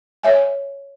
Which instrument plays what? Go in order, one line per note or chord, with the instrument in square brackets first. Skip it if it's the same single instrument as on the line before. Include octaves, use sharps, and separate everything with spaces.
[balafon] C#5 E5 G#5